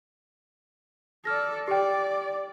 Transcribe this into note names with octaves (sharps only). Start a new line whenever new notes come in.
A4 D5 F6 A#6
G4 D5 G5